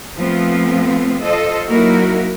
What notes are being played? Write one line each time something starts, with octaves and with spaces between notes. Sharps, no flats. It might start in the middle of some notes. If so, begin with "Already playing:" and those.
F3 A3 B3 C4 F4
F4 A4 C5 D#5
F#3 A#3 D#4 E4 F#4 A#4